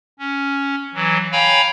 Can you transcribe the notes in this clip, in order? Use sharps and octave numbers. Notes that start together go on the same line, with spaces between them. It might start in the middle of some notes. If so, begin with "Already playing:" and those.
C#4
E3 F#3
C#5 F5 G5 G#5 A#5 B5